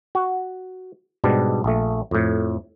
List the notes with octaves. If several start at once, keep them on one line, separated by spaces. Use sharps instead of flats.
F#4
G#2 B2 G3 D4
A#1 A3
F2 A2